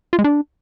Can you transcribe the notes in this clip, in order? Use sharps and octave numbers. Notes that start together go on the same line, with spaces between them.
F4
G#3
D4